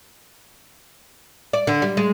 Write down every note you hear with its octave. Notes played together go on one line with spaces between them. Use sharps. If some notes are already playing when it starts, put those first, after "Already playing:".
D5
D3
G3
G#3